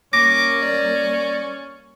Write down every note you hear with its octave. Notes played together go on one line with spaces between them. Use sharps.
G3 A#3 C#4 D6 A#6
D5